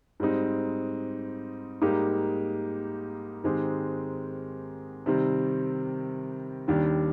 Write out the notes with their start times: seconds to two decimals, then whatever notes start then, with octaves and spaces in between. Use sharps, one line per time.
0.20 G#2 G3 C4 D#4
1.81 G#2 G3 A#3 D#4 G4
3.44 G#2 D#3 G#3 C4 G4
5.06 C3 D#3 G3 C4
6.68 D#2 D#3 G3 D4 G4